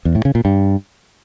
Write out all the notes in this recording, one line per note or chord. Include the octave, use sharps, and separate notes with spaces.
E2
A2
C#3
A#2
G2